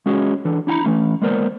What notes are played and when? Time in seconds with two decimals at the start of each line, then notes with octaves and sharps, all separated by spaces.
0.06 G#3 C#4 F#4 G#4 C#5 D#5
0.45 E3 D4 A4
0.67 D4 E4 G5 A#5 B5
0.84 E3 A3 C#4
1.22 G#3 A#3 B3 A#4 C5 D5